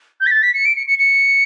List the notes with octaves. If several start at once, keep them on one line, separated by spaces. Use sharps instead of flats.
G6
B6
A6
B6
C#7
D7
C#7
C#7
C#7